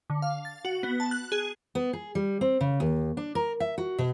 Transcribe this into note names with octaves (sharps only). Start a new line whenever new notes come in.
D3
F5
A6
F#4
B3
A5
F#6
G#4
B3
G#4
G3
C4
C#3
D#2
D4
A#4
E5
F#4
B2